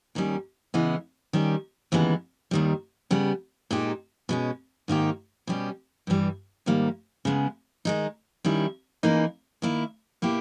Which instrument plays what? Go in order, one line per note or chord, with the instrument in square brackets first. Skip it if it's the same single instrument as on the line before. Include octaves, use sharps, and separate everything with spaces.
[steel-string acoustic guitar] D#2 D#3 G3 C#4
C#3 E3 G#3 B3
D#3 G3 C#4 G4
D#2 C#3 E3 G#3 B3
D#2 D#3 G3
C#3 G3 B3
A#2 G#3 D#4 G4
B2 G#3 C#4
G#2 D#3 A#3 D#4 G4
B2 G3 C#4 G4
G2 E3 G3
G#2 D#3 G3 A#3
C#3 G#3 B3
D#3 G#3 D#4
D#3 G3 C#4 E4
C#3 E3 A#3 D#4
D#3 A#3 E4
B2 A#3 E4 G4